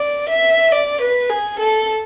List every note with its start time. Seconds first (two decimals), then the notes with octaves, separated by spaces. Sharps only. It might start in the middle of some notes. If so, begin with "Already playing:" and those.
Already playing: D5
0.29 E5
0.72 D5
1.01 B4
1.30 G#4
1.59 A4